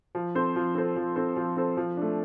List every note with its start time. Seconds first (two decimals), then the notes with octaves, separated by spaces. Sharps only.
0.15 F3
0.35 C4 A4 C5
0.56 F3
0.75 C4 A4 C5
0.96 F3
1.16 C4 A4 C5
1.36 F3
1.56 C4 A4 C5
1.77 F3
1.97 A3 D4